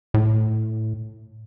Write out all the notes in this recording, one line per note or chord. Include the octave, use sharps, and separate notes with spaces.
A2